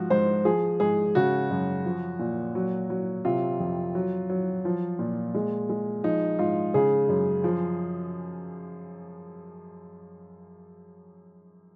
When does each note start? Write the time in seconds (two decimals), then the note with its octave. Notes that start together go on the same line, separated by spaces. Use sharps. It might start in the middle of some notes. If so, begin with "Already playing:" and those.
Already playing: G#2 F3 F#4
0.10 G#2 C5
0.45 F3 G#4
0.80 G#2 G#4
1.15 C#3 F#4
1.51 F#2
1.85 F3
2.19 A#2
2.55 F#3
2.90 F#3
3.25 C3 F4
3.60 F2
3.95 F#3
4.30 F#3
4.65 F3
4.99 A#2
5.34 G#3
5.69 G#3
6.04 F3 D#4
6.39 G#2 F4
6.74 C#3 G#4
7.09 F#2
7.44 F3